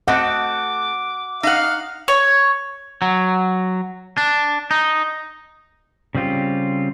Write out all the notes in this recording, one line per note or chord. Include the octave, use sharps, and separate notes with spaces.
A3 C4 D#5 F#5 D6
D#4 F5 F#5
C#5
F#3
D4
D#4
C#3 G3 C4 F4 G4